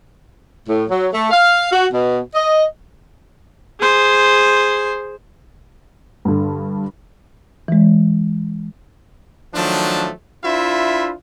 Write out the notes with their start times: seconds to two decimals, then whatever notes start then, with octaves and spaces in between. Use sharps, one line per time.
0.67 A2
0.90 F#3
1.13 A3
1.31 F5
1.72 F#4
1.92 B2
2.35 D#5
3.80 G#4 C5
6.25 G2 D3
7.68 E3 G#3
9.55 D#3 F3 F#3 A3 D4
10.44 D4 E4 F4 C5 E5 B5